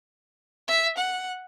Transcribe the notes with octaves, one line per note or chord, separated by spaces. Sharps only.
E5
F#5